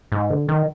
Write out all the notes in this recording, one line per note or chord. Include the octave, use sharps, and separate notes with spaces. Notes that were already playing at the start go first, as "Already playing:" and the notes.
G#2
D3
D#3